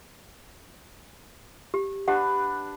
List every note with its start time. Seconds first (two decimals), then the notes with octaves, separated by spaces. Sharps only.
1.74 G4
2.08 D4 G4 B4 F#5